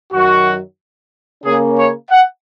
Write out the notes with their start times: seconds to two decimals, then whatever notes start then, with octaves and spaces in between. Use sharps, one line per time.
0.13 F#2 D#3 F#3 F#4
1.43 C#3 A#3 C#4 G#4
1.77 C#5
2.10 F#5